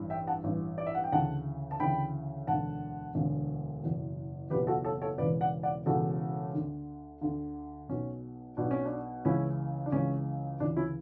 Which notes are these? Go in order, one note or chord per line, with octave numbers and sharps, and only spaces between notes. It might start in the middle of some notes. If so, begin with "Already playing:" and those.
Already playing: A1 G2 E3
E5 G5
F#5 A5
A1 G2 E3
D5
E5
F#5
G5
D2 C#3 E3 F#5 A5
A5
D2 C#3 E3 G5 B5
E1 D2 D3 F#5 A5
E1 D2 D3
F#1 E2 B2
F#1 E2 B2 G4 B4
F#4 A4
A4 C#5
A4 C#5
E1 E2 C#3 B4 D5
D5 F#5
D5 F#5
E1 E2 C#3 F#4 A4
D2 D3
D2 D3
B1 B2 C#4
B1 B2 D4
C#4
D4
C#2 C#3 E3 C#4 E4
D4
C#2 C#3 E3 C#4
D2 C#3 E3 D4
C#4 E4